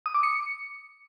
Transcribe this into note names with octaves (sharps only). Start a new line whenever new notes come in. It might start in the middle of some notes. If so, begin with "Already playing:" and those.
D#6
D6
C#7